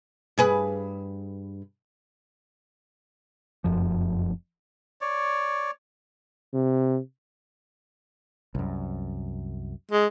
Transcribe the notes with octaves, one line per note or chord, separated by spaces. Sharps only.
G2 G#4 B4
F1 F#2 F3
C#5 D5
C3
C2 F#2
G#3